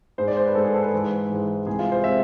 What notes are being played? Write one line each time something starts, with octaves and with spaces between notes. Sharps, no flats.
G#2 G#3 C5
D5
C5
B4
G#2 G#3 A4
G#4
A4
B4
G#2 E3 G#3
G#2 E3 G#3
C2 C3 G#3 G#4
F4
C5
C3 G#3 E5